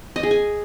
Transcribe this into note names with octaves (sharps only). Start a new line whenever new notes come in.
D#5
G#4
G#5